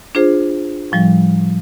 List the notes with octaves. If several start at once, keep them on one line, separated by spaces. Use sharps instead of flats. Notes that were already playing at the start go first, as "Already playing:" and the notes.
D4 F4 G#4 C5
A2 F3 G3